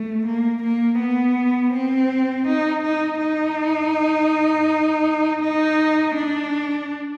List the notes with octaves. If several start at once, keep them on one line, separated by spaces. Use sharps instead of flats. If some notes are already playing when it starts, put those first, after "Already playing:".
Already playing: A3
A#3
A#3
B3
C4
D#4
D#4
D#4
D#4
D4